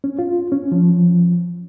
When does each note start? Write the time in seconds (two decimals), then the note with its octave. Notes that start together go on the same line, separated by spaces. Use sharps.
0.04 C#4
0.19 F4
0.52 C#4
0.72 F3